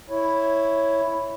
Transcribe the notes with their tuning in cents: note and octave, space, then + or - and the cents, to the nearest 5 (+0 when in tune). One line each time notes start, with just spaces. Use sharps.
E4 +0 C#5 +0